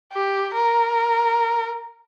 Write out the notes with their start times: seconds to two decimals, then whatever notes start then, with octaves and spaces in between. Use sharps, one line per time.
0.13 G4
0.54 A#4